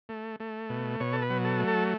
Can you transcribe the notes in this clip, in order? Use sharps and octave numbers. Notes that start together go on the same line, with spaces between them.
A3
A3
B2
B2 C#5
A4
B4
F#3
A4
A3
A4